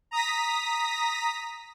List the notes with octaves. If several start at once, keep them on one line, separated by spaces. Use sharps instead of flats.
A#5 D#6 A#6 B6